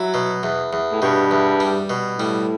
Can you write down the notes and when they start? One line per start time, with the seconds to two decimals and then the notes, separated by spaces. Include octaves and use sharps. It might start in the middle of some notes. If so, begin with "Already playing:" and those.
Already playing: F#3 E4
0.14 B2
0.43 E2
0.73 E2
0.92 A2
1.02 G2 B2
1.31 E2
1.60 G3
1.90 B2
2.18 A2 G3